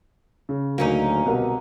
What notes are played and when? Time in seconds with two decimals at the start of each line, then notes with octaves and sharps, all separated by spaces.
0.49 C#3
0.78 D2 F#3 A#3 C#4 D#4
1.26 C2 B2 A#4